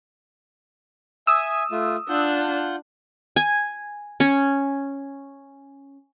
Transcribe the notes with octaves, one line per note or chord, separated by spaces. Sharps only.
E5 G#5 D#6 E6
A3 F4
D4 F4 F#5 G6
G#5
C#4